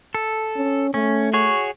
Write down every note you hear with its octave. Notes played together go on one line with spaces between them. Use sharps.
A4
C#4
A3 C#4
F#4 G#4 C#5